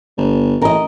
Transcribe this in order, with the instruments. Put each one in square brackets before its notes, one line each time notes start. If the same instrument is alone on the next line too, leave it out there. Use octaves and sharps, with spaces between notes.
[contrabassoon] G1
[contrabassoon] A1 [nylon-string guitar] A#4 D#5